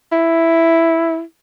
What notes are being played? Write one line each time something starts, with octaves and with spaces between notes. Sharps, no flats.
E4